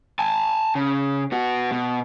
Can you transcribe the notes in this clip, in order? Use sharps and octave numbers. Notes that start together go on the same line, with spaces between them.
G#5 A5
C#3
B3 F#4
B2